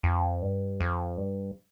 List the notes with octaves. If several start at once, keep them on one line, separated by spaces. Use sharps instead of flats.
F2
G2
F2
G2